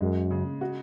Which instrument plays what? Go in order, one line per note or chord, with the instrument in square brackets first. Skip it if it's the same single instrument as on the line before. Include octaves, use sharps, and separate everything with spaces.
[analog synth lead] F#2 [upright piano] G#3
[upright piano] C#3
F#4